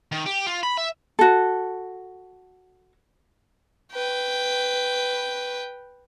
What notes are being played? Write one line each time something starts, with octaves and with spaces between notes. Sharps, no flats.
D#3
G4
F4
B5
E5
F#4 A4
B4 G5